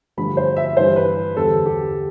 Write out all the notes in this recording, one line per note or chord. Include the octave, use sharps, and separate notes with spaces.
G2 D3 F3 A3 B5
C5
E5
G2 E3 G3 C5
B4
E2 D3 G3 A4
G4